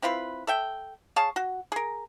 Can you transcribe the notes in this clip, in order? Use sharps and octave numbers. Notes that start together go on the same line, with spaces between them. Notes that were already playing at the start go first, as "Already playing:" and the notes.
C4 E4 F4 B4
A4 E5 G5
G#4 C#5 F5 A5
F#4
G#4 A#4